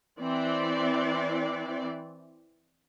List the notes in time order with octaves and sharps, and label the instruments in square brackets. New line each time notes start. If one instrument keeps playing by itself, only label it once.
[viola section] E3 C4 D5